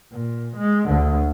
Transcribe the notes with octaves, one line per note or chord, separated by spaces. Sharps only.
A#2
G#3
D2 D3